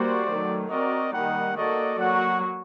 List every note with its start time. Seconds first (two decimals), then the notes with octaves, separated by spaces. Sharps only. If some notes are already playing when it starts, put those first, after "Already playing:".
Already playing: G3 A#3 F#4 C5 D5
0.26 D#3 F#3 A3
0.70 C4 F#4 A#4 D5 D#5
1.13 D#3 G3 A#3 D#4 G4 F#5
1.56 A#3 F#4 A4 D5 D#5
1.99 F#3 A#3 F#4 F#5